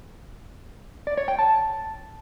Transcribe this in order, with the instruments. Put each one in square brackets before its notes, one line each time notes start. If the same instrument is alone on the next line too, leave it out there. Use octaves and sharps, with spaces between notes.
[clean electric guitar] D5
C#5
G5
A5